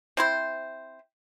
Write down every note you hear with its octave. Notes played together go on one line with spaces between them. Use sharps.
C4 E4 C5